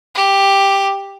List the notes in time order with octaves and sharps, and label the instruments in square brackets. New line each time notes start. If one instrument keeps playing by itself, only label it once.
[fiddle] G4